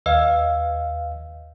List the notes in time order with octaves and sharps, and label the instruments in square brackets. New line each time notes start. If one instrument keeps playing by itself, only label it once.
[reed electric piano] D#2 F5 [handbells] B4 D#5 E6